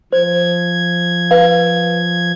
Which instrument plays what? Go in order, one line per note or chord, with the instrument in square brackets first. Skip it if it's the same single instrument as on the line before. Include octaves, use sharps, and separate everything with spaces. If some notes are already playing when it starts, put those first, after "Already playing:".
[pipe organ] F3 G#6 [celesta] C5
[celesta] B4 F5